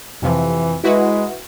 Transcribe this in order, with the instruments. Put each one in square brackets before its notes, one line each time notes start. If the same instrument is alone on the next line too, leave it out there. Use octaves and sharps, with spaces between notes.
[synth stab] F2 C3 F3 [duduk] E3
[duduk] G#3 [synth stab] E4 F#4 B4